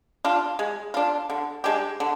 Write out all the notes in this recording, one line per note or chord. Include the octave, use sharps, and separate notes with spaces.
D4 F4
G#3
D4 F4
D3
G#3 D4 G4
D3